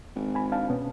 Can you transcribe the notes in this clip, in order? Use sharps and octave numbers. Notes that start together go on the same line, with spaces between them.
G#1
G#5 B5
D4 F5 A5
B2 B3 C#4